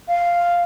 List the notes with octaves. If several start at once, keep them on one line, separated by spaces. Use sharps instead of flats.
F5